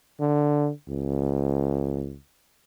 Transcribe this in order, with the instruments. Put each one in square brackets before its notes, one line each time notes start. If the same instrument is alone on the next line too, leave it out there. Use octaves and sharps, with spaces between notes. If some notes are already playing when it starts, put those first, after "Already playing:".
[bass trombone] D3
C#2